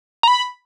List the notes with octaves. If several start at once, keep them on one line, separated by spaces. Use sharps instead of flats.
A#5
B5